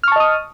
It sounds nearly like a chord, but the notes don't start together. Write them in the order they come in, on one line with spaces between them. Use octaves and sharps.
F6 C#6 A5 D#5 D#6